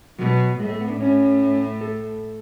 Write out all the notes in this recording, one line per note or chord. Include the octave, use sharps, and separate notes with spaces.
B2 F#3
A2 G#3
A3
B3
D4
A2 C#4
A4